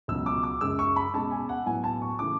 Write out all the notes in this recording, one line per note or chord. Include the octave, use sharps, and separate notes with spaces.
C#2 B2 F#3 C#4 E6
D6
D6
F#2 C#3 G#3 E6
C#6
B5
B2 G#3 C#4 A5
G#5
F#5
A2 F#3 B3 G#5
A5
C#6
C#3 E3 A3 C#4 D6